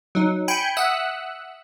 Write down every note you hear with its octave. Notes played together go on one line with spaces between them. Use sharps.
F#3 D#4
G5 G#5 B5 G6 C#7
E5 F#5 D#6 E6 F#6